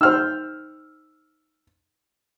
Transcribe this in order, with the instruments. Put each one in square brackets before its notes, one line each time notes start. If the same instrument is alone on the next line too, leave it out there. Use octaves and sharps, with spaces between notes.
[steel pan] D#4 C5 [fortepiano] E6 F6